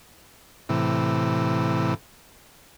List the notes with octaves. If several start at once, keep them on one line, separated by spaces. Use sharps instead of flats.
A2 C3 E3